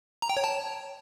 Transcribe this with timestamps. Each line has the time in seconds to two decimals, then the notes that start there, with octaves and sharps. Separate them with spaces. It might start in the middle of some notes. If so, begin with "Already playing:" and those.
0.22 A#5
0.29 G5
0.37 C#5
0.44 A5